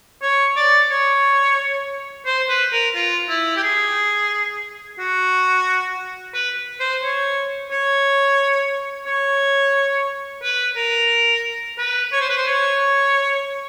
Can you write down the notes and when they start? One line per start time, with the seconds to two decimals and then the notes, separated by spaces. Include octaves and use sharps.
0.22 C#5
0.56 D5
0.90 C#5
2.26 C5
2.49 B4
2.72 A#4
2.95 F4
3.29 E4
3.56 G4
3.63 G#4
4.99 F#4
6.34 B4
6.80 C5
7.03 C#5
7.71 C#5
9.06 C#5
10.42 B4
10.76 A#4
11.78 B4
12.13 C#5
12.21 C5
12.29 B4
12.37 C5
12.47 C#5